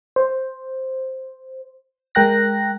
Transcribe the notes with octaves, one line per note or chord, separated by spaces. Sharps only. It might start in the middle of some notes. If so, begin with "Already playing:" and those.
C5
G#3 A#4 G5 F#6 A#6